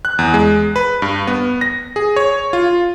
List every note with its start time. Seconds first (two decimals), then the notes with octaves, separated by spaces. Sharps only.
0.05 F#6
0.19 E2
0.34 G#3
0.76 B4
1.02 G2
1.27 B3
1.61 A#6
1.96 G#4
2.16 C#5
2.53 F4